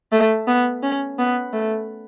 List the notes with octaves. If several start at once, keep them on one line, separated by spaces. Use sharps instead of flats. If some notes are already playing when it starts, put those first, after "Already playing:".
A3
B3
C#4
B3
A3